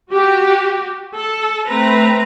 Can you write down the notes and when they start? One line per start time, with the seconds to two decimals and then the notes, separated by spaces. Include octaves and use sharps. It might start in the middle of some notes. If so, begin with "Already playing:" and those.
0.11 F#4 G4
1.15 A4
1.68 A3 C4 B4 A#5